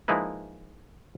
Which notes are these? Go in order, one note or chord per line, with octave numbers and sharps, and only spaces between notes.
F3 G#3 A#3 D#4 E4 B4